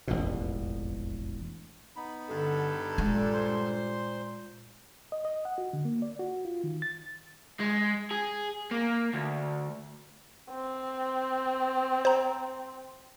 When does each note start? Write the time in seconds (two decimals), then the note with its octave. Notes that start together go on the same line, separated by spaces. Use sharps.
0.08 E1 A1 F2 B2
1.96 B3 D#4 B5
2.28 G2 D3 A4
2.98 A#2 G#3
3.33 C5 C6
5.12 D#5
5.25 D#5
5.45 F#5
5.58 F#4
5.73 D3
5.85 A#3
6.02 D5
6.19 F#4
6.45 F4
6.64 D#3
6.82 A6
7.60 G#3
8.11 G#4
8.71 A#3
9.13 D2
10.51 C4
12.05 C5 A#5